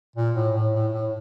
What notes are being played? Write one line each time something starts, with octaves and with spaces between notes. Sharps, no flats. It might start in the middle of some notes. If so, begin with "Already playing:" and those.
A#2
A2
A2
A2
A2